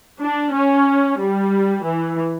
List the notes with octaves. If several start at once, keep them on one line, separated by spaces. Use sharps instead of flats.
D4
C#4
G3
E3